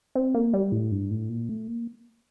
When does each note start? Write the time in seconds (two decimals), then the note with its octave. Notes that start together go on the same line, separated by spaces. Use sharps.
0.15 C4
0.35 A#3
0.54 G3
0.72 A2
0.91 G2
1.11 A2
1.29 A#2
1.49 A3
1.67 A#3